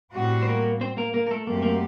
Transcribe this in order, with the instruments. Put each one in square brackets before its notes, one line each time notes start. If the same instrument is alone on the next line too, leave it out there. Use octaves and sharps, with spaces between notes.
[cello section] A2 G3 C4 F#4
[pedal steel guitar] C5
A#3 A#4
C4 C5
A#3 A#4
A#3 A#4
A#4
A3 A4
[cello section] F#2 F#3 A3 C4 G4 [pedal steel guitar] A#3
[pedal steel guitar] A#3